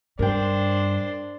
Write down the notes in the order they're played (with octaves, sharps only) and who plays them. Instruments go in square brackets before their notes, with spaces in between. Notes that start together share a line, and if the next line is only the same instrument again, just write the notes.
[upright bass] G2 [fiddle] D4 C5 [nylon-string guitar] A#4 G5